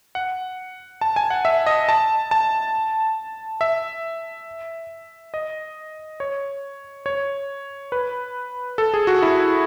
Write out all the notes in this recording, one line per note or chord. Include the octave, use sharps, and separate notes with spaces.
F#5
A5
G#5
F#5
E5
D#5
A5
A5
E5
D#5
C#5
C#5
B4
A4
G#4
F#4
E4